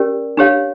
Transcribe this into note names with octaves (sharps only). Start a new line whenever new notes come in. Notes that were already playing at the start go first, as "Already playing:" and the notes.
Already playing: C#4 G4 A#4 D5
D4 G4 C#5 F5